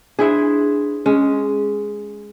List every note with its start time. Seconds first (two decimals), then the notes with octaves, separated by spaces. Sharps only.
0.19 D4 E4 G#4 C5 E5
1.06 G#3 C#4